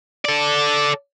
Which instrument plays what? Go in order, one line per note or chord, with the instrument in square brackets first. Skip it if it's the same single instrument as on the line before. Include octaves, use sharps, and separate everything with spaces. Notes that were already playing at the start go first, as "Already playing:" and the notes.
[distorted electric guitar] A4 D5